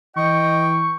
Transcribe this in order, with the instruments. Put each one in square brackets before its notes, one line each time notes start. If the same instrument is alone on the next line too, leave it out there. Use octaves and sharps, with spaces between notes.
[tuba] E3 [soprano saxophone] D#5 [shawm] G5 [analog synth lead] C#6